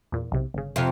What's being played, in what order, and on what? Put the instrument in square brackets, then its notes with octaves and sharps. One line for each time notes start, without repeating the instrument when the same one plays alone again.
[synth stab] E2 A#2
B1 C3
G1 C#3
[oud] F2 C3